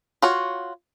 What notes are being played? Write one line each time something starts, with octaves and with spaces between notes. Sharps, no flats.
F4 F#4 C#5